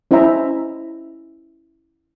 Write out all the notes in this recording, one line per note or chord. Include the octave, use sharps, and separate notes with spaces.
C#4 E4 C5 D#5 E5 A#5